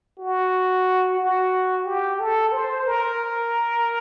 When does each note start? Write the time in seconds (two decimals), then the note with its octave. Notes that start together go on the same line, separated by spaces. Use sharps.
0.19 F#4
1.19 F#4
1.86 G4
2.20 A4
2.53 C5
2.86 A#4